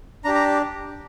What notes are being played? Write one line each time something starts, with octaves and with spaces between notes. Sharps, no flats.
D4 G4 A#5
A#5